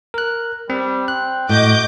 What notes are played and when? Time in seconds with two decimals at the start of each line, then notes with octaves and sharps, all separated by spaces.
0.14 A#4 F#6
0.70 G3 C4
1.08 C4 F#6
1.49 A2 F#4 D#5 D6 G6